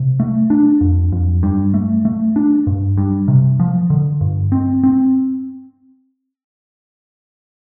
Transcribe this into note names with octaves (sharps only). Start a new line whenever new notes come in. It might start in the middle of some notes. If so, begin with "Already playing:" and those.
Already playing: C3
A3
D4
F2
F2
G2
A3
A3
D4
G2
G2
C3
F3
D3
G2
C4
C4